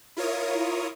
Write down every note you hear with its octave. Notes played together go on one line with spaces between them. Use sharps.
E4 F4 A#4 C#5 D#6